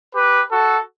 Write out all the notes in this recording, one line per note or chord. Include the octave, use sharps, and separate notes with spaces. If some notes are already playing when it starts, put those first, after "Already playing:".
G4 B4
F#4 A4